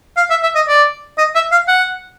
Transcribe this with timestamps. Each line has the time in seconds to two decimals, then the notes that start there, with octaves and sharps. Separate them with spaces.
0.17 F5
0.30 E5
0.43 E5
0.55 D#5
0.68 D5
1.18 D#5
1.35 E5
1.52 F5
1.68 F#5